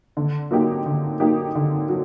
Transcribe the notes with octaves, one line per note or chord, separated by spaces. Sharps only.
D3
F#3 A#3 D#4 G4
D3
F#3 A#3 D#4 G4
D3
F#3